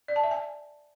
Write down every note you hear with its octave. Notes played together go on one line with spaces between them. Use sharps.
D5
A5
E5
G#5